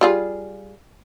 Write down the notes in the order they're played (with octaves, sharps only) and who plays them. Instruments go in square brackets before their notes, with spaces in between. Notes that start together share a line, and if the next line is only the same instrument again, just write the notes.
[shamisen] G3 F4 G#4